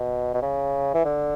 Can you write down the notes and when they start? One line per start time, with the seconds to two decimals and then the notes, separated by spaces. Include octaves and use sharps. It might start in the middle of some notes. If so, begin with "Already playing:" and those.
Already playing: B2
0.34 B2
0.42 C#3
0.94 E3
1.05 D3